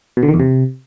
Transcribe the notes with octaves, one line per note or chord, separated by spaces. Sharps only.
B2
D3
D#3
E2
C3